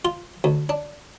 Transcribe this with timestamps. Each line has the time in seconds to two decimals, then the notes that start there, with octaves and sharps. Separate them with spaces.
0.05 F4
0.44 D2
0.69 D4